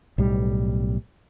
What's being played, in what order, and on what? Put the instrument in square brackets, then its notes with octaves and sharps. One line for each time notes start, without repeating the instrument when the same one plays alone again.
[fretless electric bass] B1 A2 G3